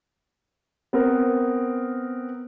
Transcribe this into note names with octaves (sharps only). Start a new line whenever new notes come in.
B3 C4 A#4